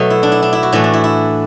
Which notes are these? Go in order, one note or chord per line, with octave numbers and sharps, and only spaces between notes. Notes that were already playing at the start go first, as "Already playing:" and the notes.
Already playing: B2 F#3 A3
E4
D4
E4
D4
E4
F#4
A2 E3 A3 D4
D4
E4
E4